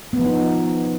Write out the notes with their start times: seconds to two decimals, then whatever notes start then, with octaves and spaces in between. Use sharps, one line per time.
0.13 B3
0.19 F3
0.25 D#4